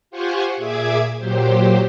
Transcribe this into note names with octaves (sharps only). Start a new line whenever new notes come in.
F4 G4 C5 F#5 G#5 C#6
A#2 G#4 E5 D6 G#6
A#2 F#3 G4 C5